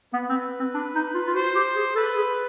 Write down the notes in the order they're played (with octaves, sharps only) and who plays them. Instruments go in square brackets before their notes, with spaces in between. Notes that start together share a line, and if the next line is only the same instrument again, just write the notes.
[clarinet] B3 [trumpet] B4
[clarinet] C4
C4
D4
D#4
F4
F4
[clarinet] F#4 [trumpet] C5
[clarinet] G4
G#4
[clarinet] A4 [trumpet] B4
[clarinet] G#4